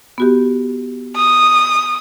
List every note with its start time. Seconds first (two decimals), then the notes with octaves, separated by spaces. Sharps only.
0.18 B3 F#4 G4
1.16 D#6